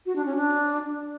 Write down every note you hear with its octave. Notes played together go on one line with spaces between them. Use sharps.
F#4
D4
C#4
D4